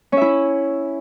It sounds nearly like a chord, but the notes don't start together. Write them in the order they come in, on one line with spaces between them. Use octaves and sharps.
C#4 E5 E4